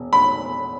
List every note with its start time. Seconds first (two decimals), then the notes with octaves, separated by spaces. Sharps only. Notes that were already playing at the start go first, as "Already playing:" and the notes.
Already playing: E1
0.13 B5